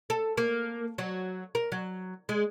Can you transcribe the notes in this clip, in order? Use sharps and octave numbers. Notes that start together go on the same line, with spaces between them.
A4
A#3
F#3
A#4
F#3
G#3